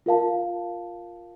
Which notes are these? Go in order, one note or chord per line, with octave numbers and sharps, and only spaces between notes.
F4 A#4 F5 A5